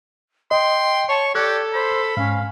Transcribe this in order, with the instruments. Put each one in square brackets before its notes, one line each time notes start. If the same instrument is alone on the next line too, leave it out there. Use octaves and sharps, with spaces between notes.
[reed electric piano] D#5 [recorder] G5 [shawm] C6
[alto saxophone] C#5 [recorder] A5 [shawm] C#6
[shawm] G4 [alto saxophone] A4 [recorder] D5 [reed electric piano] F#6 G#6
[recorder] C5 [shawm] B5
[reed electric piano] G#2 [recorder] C#4 [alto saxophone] F5